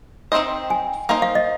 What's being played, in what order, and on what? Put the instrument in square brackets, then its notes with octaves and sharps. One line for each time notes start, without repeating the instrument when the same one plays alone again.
[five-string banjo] D#3 C4 F4 C5 D#5
[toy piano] G#5
[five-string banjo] A#3 D#4 C5 [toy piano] F5
[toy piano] F5
D#5